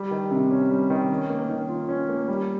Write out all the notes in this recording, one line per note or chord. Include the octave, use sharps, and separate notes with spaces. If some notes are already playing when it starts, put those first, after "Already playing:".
Already playing: G3
D#3
C3
C#4
G3
D#3
C#4
A#3
D#3
F4
C#4
A#3
G3